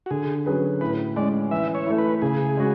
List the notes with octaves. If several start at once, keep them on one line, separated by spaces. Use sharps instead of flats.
F#4
D3 G#4
F#3 C#4 G#4 B4
A2 B4
G#3 C#4 D5
E3 E5
C#5
A3 E4
B4
C#3 G#4
G#3 C#4 F#4